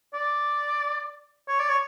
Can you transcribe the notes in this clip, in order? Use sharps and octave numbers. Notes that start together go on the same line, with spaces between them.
D5
C#5
D5
C#5